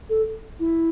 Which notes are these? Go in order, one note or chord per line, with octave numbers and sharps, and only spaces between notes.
A4
E4